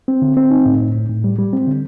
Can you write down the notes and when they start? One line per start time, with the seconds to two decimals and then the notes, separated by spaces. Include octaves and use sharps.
0.08 C4
0.22 D3
0.37 C4
0.51 D#4
0.66 A2
0.81 A2
0.95 A2
1.09 A2
1.24 G3
1.39 G3
1.53 C4
1.67 D3